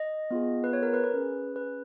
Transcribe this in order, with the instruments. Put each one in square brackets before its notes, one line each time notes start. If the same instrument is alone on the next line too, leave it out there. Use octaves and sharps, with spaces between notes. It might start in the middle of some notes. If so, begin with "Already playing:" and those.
Already playing: [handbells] D#5
B3 F4 G#4
B4
C#5
A#4
B4
B4
C#4 G#4
B4